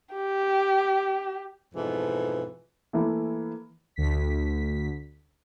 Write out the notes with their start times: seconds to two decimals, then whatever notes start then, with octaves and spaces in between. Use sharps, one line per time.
0.13 G4
1.73 F2 G#2 B2 E3
2.93 E3 A3 A#3 E4
3.96 D2 B6